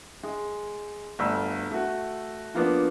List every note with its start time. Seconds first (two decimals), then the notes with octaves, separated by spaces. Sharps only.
0.23 G#3
1.19 G1 D2 E6
1.71 A3 F#4
2.54 F3 A#3 B3 D4